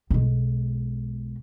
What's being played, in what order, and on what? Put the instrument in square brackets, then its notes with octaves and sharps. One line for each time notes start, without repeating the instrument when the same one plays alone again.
[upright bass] B1 G#3